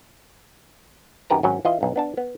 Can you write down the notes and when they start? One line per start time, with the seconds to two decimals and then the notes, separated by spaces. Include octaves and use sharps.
1.30 F#2 D#3 G4 B4 A#5
1.43 G#1 F#3 C#4
1.65 E3 F4 D#5
1.81 B1 G2
1.96 B3 D4 A5
2.17 B3